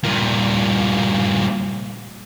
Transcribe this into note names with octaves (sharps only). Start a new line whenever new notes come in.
G2 A#2